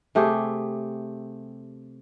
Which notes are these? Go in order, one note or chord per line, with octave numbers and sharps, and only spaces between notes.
C3 A3 G4 G#4